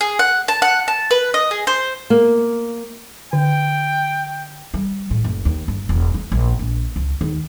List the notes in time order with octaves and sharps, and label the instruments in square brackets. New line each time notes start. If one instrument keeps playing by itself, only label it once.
[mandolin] G#4
F#5
A5
F#5
A5
B4
D#5
G#4
C5
[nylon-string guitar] A#3
[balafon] D3 [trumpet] G5
[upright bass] G3
A2
F#1
D#2
G1
E1
B3
A#1
A#1
C#2
D#2